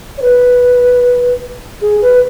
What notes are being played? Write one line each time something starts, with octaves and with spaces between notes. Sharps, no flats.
C#5
B4
G#4
B4